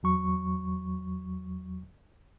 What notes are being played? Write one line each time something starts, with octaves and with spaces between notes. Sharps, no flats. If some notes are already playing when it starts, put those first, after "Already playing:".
E2 F#3 C#6